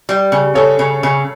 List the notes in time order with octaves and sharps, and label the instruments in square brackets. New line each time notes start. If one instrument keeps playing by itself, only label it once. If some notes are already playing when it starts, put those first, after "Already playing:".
[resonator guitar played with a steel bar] G3
C#3
[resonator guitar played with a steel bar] C#3 [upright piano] A4 C#5
[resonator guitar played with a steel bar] C#3
C#3